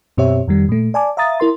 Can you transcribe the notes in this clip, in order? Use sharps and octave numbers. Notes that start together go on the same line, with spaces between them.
F#2 B2 C4 G4 C#5 E5
F2 D#3 G3
A#2 A3
D5 G#5 A5 D6
E5 F5 A#5 D#6 A6
E4 A#4 C6